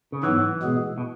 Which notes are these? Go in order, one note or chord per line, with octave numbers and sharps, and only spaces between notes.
C#3
G#2 E3 F#3 B3
B2 G#3 B3 G#4
B2